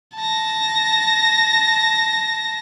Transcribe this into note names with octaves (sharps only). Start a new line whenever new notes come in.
A5 A#6